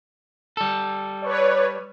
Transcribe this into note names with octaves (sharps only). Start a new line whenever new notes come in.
G3 A4
B4 C#5 D5